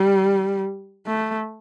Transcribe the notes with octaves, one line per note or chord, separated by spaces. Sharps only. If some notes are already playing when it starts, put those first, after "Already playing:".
Already playing: G3
A3